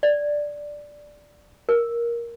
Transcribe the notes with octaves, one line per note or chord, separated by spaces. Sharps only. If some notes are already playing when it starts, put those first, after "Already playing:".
D5
A#4